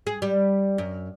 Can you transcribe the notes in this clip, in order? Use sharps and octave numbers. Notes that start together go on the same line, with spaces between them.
G#4
G3
F#2